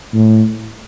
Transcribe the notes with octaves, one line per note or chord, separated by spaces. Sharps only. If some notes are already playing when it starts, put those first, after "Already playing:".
A2